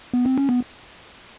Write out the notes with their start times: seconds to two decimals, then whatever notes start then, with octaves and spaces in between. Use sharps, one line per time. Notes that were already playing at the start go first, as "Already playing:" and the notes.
0.14 B3
0.26 C4
0.38 C#4
0.49 B3